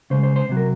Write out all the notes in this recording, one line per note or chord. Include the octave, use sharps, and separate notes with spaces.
C#3 G#3 C5
C5
C5
C3 F#3
A#4